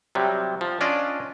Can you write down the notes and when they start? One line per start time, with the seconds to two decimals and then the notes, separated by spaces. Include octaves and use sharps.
0.15 C3 F#3 G3
0.61 F3
0.81 C#4 D4 F4 D5 D#5